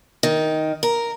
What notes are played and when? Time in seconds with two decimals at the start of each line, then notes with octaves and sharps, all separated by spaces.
0.23 D#3
0.83 A#4